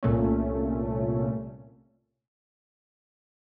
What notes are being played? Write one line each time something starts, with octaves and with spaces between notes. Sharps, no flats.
C2 A#2 A3 C#4